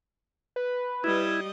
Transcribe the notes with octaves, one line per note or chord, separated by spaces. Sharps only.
B4
G3 E4 D#5